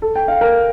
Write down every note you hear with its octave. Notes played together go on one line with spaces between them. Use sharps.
A4
G5
F5
A#4